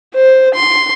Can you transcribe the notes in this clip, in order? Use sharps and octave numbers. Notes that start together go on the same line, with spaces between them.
C5
C6